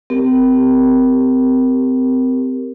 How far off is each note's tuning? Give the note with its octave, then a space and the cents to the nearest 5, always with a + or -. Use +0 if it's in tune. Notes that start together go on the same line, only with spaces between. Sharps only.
C4 -30 G4 +0 A#4 +0